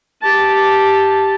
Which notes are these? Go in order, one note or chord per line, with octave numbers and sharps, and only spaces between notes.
G4 A5